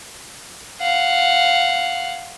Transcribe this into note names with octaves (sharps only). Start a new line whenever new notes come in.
F5 F#5